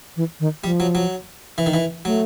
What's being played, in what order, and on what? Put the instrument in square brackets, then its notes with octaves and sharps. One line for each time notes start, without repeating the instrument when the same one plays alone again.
[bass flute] E3
D#3
[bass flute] F3 [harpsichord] G3
[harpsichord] F#3
F#3
E3
D#3
E3
[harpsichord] F#3 [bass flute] A3